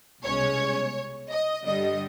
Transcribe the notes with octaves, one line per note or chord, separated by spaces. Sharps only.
C2 B2 G#3 C#4 C#5
D#5
G2 D3 G3 D#5